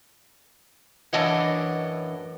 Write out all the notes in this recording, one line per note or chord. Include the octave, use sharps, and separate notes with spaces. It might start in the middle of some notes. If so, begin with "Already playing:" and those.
F#2 A2 E3 D4 D#5 F#5